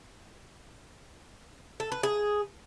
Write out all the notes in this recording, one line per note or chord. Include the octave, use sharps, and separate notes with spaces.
A4
B4
G#4